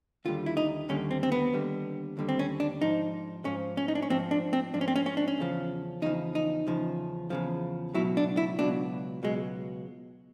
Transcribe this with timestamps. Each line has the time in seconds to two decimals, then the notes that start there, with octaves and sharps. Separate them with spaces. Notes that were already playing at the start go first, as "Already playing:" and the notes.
0.25 D#2 D3 G3 F4
0.46 E4
0.57 D#4
0.89 D#2 D3 G3 C#4
1.11 C4
1.23 C4
1.32 B3
1.53 D#2 D3 G3
2.17 D#2 D3 G3
2.29 C4
2.39 C#4
2.60 D4
2.81 G#2 F3 D#4
3.45 G#2 F3 C#4
3.77 C#4
3.88 D#4
3.95 D4
4.02 C#4
4.10 G#2 F3 C4
4.31 D4
4.53 C4
4.73 G#2 F3 D4
4.81 C#4
4.88 C4
4.96 C#4
5.06 C#4
5.17 D4
5.28 C#4
5.38 E2 C#3 F3
6.02 E2 C#3 F3 D#4
6.35 D#4
6.67 E2 C#3 F3
7.30 E2 C#3 F3
7.94 C#2 B2 F#3 E4
8.17 D4
8.37 E4
8.59 C#2 B2 F#3 D4
9.23 C#2 B2 F#3 G#3